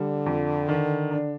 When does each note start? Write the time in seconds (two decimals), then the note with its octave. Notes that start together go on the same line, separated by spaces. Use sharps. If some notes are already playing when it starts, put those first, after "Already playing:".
Already playing: D3 G3
0.26 F2
0.68 D#3
1.11 D4